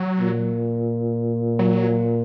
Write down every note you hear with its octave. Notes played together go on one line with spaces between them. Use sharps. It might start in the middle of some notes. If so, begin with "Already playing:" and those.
Already playing: F#3
A#2
F#3